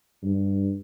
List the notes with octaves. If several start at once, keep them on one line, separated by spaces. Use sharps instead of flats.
G2